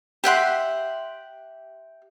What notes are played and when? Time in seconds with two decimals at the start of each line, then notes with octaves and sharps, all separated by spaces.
0.24 G4 E5 F#5 C6